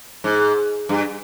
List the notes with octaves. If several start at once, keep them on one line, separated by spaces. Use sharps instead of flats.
G#2
G2